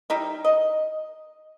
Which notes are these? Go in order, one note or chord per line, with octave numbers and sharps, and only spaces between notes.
G3 D#4 E4
D#5